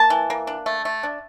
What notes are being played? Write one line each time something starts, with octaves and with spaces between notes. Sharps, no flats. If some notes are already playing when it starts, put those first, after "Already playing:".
Already playing: A#3 A5
E3
A#3
D4
A3
A3
D4